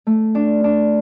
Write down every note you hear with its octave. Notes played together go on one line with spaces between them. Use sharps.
A3
D4
D4